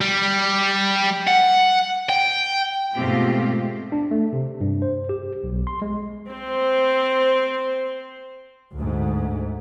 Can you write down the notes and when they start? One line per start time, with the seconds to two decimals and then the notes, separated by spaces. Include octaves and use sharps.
0.01 G3
1.28 F#5
2.09 G5
2.95 G#2 B2 A3 C4 F4 G4
3.92 D4
4.11 A3
4.33 C3
4.61 G2
4.82 C5
5.09 G4
5.44 B1
5.67 C6
5.82 G#3
6.31 C4 C5
8.76 D2 G#2